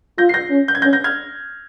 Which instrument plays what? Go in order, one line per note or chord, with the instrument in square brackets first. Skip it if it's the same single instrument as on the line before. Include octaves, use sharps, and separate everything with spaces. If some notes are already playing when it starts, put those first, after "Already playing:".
[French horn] F4 [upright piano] G6 A#6
[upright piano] C7
G6 A#6
[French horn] C#4
[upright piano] G6
G#6
[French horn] C#4 [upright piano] G6 A#6
[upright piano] G6 A#6
F6 G#6